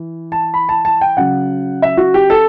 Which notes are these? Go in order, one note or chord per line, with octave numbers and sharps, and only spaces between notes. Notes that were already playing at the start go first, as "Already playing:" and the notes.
Already playing: E3
A5
B5
A5
A5
G5
C#3 F#3 F#5
E5
F#4
G4
A4